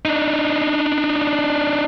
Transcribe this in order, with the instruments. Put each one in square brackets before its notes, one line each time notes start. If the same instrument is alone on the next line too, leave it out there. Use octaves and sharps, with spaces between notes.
[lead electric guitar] D4 D#4